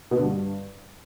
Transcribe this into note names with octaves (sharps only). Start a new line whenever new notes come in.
B2
D3
G2